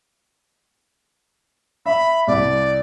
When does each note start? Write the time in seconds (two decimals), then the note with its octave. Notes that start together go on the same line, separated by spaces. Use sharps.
1.86 E5 B5
2.27 C2 D5